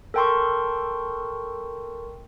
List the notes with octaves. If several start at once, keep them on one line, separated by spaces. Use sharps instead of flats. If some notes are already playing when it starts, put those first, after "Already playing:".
A4 A#4 G5 A5 C6 C#6